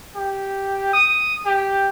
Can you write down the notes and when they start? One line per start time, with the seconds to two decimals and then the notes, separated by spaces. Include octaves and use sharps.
0.15 G4
0.93 D#6
1.45 G4